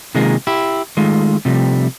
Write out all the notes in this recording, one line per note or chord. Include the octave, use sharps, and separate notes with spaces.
C3 D#3 G#3 A#3 F4 G#4
E4 G4
D#3 G#3 A3 F4
C3 F3 G3 A3